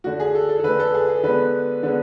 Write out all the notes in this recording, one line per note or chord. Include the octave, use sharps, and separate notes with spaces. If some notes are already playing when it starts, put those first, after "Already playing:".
D3 A3 F#4
G#4
A4
A4
A4
D3 A3 B4
A4
G#4
G#4
D3 G#3 B3 B4
D3 G#3 B3